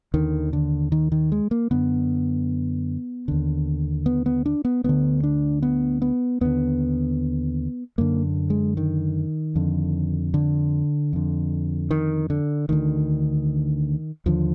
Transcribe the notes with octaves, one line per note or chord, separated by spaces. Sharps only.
D#2 D3 D#3
D3
D#3
D#3
G#3
A#3
F#2 D3 B3
D#2 D3
B3
B3
D4
B3
D2 D3 B3
D4
B3
B3
D#2 D3 B3
F#2 D3 A#3
G#3
D#3
F2 D3
D3
F2 D3
D#3
D3
D2 D3 D#3
D#2 D3 F3